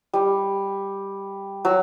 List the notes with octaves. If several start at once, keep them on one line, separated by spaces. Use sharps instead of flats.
G3
F#3